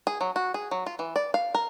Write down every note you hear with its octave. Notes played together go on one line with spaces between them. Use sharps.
G#4
F#3
F#4
G#4
F#3
F4
E3
D5
F5
A#4